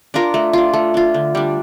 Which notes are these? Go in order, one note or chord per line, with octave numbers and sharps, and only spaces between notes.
D4 F4 A#4
A3
D4 F4
A3
D4 F4
D3
G3 D4